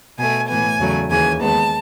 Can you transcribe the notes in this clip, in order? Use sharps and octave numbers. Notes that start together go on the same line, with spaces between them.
B2 A3 G#5
A2 E3 B3 G#5
E2 C#3 F#3 A3
D#2 C#3 E3 G#5
D#2 D#3 G#3 B3 A5